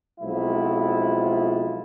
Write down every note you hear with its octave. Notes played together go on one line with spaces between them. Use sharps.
B1 F3 G#3 C4 E4 F4